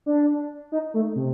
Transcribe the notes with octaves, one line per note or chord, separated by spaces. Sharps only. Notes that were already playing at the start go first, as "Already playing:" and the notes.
D4
D#4
A3
C3